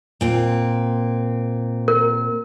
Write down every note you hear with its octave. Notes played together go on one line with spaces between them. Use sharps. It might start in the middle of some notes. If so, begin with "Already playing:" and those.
A#2 C4
A#4